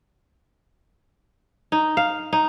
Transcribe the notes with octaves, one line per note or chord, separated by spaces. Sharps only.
D#4
F5
D#4